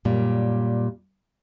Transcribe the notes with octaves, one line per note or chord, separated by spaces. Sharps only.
F#2 A#2 G3